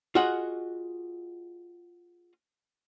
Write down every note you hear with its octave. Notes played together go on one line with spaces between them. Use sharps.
F4 F#4 G#4 D#5 F#5